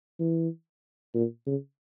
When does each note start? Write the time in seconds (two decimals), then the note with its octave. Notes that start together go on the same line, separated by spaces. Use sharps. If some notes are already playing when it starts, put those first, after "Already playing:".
0.20 E3
1.15 A#2
1.46 C#3